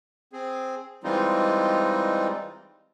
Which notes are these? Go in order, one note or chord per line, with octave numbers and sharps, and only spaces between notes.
C4 G#4
E3 G3 G#3 C4 D#4 F4